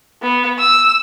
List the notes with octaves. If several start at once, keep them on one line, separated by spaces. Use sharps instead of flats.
B3
E6